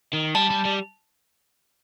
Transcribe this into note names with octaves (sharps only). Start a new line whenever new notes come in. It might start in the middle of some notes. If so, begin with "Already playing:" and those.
D#3
G3 A5
G3
G3